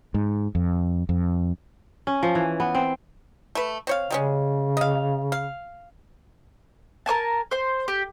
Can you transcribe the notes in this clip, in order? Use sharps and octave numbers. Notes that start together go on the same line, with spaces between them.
G#2
F2
F2
C#4
F3
E3
B3
C4
A3 B4
C4 C#5 F5
C#3 G3 G#3 C#4
D#5 F5
F5
A#4 C#5 G#5 A5
C5 C6
G4